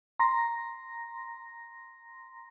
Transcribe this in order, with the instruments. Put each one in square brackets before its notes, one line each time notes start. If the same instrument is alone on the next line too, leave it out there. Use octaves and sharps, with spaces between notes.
[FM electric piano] A#5 C6 A#6